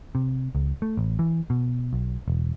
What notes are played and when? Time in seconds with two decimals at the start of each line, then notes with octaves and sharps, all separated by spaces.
0.15 C3
0.55 C#2
0.82 A3
0.97 A1
1.19 E3
1.50 B2
1.93 B1
2.28 E1